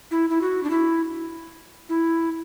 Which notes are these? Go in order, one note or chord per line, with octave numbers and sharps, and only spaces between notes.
E4
E4
F#4
D4
E4
E4